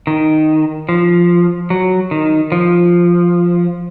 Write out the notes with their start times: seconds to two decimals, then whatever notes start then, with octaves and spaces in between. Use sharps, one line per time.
0.07 D#3
0.89 F3
1.70 F#3
2.11 D#3
2.52 F3